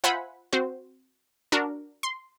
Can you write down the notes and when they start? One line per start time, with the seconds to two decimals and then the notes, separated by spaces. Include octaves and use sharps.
0.04 F4 C5 E5 F#5 G#5 B5
0.53 C4 F#4 C5
1.52 D4 F#4 A#4
2.03 C6